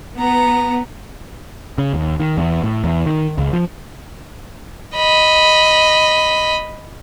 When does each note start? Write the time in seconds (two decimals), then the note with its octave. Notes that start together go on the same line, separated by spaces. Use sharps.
0.19 B3 A#5
1.78 C#3
1.94 D#2
2.20 D#3
2.37 E2
2.63 A2
2.84 E2
3.06 D#3
3.38 C#2
3.53 F3
4.95 D#5 B5